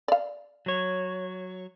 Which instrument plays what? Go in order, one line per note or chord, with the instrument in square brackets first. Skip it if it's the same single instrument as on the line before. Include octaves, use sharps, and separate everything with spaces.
[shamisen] D5 F5
[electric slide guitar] F#3 C#5